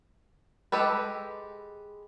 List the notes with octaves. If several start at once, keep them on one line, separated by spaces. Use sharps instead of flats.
G#3 G4 A4 B4